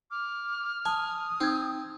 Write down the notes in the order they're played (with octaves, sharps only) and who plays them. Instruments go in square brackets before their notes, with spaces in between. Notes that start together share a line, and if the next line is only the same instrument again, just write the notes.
[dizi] D6 [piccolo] F6
[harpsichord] G#5 [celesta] A5 [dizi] D#6
[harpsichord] C4 [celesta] D#4 G#6